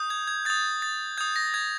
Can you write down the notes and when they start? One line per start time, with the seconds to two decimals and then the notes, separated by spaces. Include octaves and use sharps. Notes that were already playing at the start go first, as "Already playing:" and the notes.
Already playing: D#6 G6
0.10 G#6
0.27 G#6
0.45 D#6 G6 A6
0.82 A6
1.18 D#6 G6 G#6
1.36 A#6
1.54 G#6